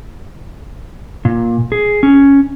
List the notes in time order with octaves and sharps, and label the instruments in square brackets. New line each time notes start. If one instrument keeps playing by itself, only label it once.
[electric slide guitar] A#2
G#4
C#4